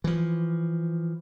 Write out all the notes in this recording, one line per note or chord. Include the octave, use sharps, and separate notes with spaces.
E3 F3